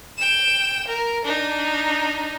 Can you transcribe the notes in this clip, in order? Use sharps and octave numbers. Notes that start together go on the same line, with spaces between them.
G5 E7
A#4
D4 D#4